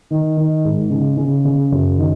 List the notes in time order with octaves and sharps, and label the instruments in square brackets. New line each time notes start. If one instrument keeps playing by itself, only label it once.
[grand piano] D#3
D#3
G#2
C#3
C#3
C#3
F#2
D#3